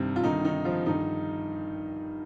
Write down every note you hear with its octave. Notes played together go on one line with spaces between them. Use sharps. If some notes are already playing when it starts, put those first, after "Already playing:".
Already playing: G2 C3 D#3 C4
F4
G2 D3 D#3 D#4
D#3 D#4
F3 F4
G2 D3 D#3 D#4